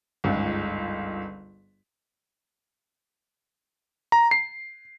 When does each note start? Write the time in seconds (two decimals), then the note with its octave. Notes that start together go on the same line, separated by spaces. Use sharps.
0.24 G1 C#2 G#2
4.12 A#5
4.31 C7